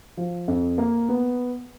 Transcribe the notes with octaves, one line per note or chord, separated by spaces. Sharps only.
F3
F2
A#3
B3